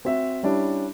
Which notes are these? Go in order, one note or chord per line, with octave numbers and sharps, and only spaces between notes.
C4 F#4 E5
G3 C#4 D4 E4